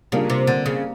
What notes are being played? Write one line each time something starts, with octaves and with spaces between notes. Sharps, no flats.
C#3 G3 A#3 D4 F4
C3
D3
C#3